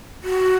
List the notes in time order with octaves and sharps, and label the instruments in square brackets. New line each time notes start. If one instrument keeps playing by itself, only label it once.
[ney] F#4